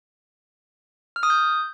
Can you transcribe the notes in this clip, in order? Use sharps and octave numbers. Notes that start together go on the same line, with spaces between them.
F6
D#6
G6